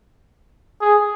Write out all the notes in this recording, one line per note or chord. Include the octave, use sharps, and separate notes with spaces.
G#4